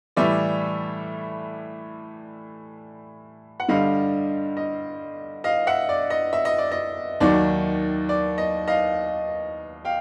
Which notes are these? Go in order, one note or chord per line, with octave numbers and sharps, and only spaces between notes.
A2 E3 G3 D5 E5
F#5
G2 D3 G3 D#5 F5
D#5
D#5 F5
E5 F#5
D5
D#5
E5
D#5
D5
D#5
D#2 D#3 F#3 D5
D5
D#5
D#5 F5
F5 G5